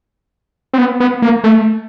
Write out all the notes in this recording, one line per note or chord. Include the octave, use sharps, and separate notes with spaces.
C4
B3
B3
A#3
A3